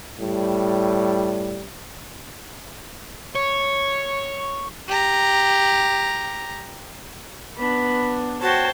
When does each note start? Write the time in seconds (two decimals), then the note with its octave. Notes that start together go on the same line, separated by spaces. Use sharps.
0.20 A2 G3
3.35 C#5 C#6
4.88 G4 A#5
7.58 B3 D4 B5
8.42 F#4 C5 C#5 G5 A5